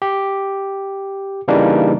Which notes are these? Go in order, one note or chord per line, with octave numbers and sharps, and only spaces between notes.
G4
C#3 E3 G3 A#3 D4 D#4